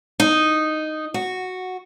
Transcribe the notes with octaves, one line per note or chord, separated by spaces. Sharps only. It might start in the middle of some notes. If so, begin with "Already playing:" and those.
D#4
F#4